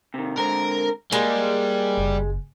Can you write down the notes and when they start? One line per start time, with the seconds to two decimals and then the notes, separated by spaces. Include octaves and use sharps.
0.14 C3 D#3
0.38 D3 G#3 C4 A#4
1.12 G3 G#3 A#3
1.97 F#1